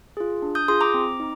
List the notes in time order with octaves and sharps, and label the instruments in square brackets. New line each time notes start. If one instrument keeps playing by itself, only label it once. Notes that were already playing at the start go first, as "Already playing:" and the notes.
[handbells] F4 G#4
D4
D#6 G6
F4 G#4 C6 D#6
A#5 D6
C4
D#4